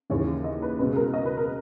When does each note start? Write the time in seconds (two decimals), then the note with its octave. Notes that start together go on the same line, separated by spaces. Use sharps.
0.10 D#2 C#3 E3 A#3 C#5
0.44 D#5
0.62 B4
0.79 C#2 B2 G#3 B4
0.93 G#4
0.96 A#4
1.13 D#5
1.25 B4
1.37 A#4